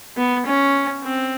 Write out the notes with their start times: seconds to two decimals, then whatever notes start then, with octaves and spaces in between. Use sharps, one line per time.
0.17 B3
0.46 C#4
1.03 C4